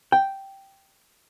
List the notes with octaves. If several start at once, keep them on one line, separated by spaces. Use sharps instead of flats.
G5